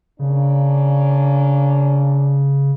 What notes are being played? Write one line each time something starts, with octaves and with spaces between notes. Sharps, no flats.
C#3 A#3 C#4 D4